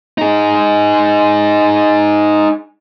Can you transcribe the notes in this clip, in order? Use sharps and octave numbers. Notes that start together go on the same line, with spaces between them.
D#4 G#4